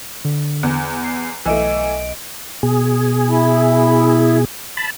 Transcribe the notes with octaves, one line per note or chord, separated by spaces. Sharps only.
D3
E2
C7
B1 E3 A3 D#5 D7
B2 G#4
E4
A5 B5